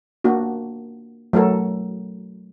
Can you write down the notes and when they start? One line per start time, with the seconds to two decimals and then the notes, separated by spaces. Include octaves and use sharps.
0.24 A#3 D4 F#4
1.33 F#3 A3 F#4 A4 A#4